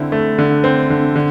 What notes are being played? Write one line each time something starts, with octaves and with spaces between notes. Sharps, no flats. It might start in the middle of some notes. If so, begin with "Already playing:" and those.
Already playing: D3 C4 E4
A3
D3
C4
D3
D3